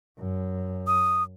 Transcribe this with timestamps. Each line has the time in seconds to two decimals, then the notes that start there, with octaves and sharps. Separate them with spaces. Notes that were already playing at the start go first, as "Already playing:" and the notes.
0.19 F#2
0.87 D#6